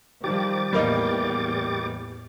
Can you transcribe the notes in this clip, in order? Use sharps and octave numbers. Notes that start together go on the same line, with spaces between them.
D#3 F3 G3 G4 D6 A6
E2 A2 G3 A#3 D#4